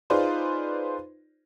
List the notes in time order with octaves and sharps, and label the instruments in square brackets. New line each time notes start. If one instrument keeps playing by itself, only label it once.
[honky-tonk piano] D#4 F4 G#4 B4 C5 D5